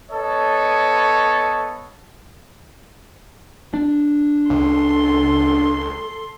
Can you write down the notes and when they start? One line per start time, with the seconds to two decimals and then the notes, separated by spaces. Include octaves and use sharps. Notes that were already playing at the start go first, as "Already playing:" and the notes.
0.11 B3 A4 C#5 D#5
3.74 D4
4.50 C#2 A4 C6